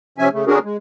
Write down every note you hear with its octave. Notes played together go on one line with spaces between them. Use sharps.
C3 F3 C#4 E5 G#5
C#3 A3
D3 C#4 D4 F#4 G#4 A#4
G#3